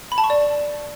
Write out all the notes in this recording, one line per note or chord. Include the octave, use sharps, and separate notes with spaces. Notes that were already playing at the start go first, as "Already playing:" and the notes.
B5
A5
C#6
D5